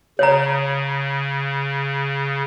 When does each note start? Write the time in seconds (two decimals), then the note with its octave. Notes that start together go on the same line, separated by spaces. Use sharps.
0.19 C#3 C#5 A#5